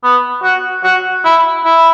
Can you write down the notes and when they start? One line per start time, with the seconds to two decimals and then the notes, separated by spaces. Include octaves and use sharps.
0.04 B3
0.43 F#4
0.84 F#4
1.24 E4
1.65 E4